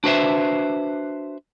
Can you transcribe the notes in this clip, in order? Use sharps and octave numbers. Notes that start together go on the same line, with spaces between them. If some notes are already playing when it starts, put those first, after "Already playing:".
D4 F#4 B4 C5 E5